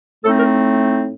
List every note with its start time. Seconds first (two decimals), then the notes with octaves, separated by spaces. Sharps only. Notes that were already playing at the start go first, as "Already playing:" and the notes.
0.23 A2 A3 C4 D#4 A4
0.37 A#4